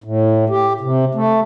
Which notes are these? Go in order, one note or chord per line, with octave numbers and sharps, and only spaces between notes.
A2
G4
C3
A3